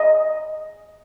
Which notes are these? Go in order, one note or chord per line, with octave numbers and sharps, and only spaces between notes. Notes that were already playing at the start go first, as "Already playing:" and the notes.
Already playing: D#5